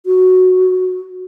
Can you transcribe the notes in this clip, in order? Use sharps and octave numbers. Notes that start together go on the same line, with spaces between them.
F#4